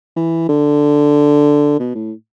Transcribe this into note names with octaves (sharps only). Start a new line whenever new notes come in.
E3
D3
B2
A2